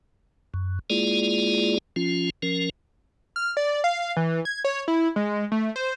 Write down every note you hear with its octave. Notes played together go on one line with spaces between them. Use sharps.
F#2
G#3 A#3 E4 F4 G#4 D5
F3 C#4 F4
F3 C#4 A#4
F6
D5
F5
E3
G#6
C#5
E4
G#3
A3
C5